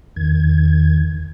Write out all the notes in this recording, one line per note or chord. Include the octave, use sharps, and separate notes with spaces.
E2 D#3 G#6